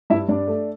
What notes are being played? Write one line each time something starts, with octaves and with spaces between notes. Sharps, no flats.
G2 E4 E5
G2 D4 D5
A3